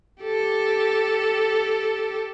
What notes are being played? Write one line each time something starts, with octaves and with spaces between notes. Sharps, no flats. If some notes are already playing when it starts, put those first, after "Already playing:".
G4 A4